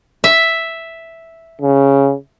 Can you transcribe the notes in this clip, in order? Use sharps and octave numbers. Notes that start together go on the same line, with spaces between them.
E5
C#3